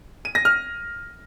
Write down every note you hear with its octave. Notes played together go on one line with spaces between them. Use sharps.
D#7
A#6
F6